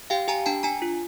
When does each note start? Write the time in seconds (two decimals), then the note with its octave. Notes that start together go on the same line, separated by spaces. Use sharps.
0.10 G4 F5 G5
0.28 G4 G#5 A#5
0.46 D4 G5 A5
0.63 D4 G#5 A#5
0.82 F4